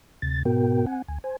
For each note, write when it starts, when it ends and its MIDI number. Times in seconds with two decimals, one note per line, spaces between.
0.22 0.43 38
0.22 0.43 48
0.22 0.43 93
0.45 0.85 44
0.45 0.85 47
0.45 0.85 59
0.45 0.85 66
0.45 0.85 70
0.45 0.85 79
0.86 1.02 60
0.86 1.02 78
0.86 1.02 80
1.08 1.18 38
1.08 1.18 80
1.24 1.37 72
1.24 1.37 80